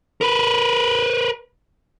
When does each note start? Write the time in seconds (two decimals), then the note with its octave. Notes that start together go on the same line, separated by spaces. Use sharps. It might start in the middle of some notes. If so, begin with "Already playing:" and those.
0.21 A#4 B4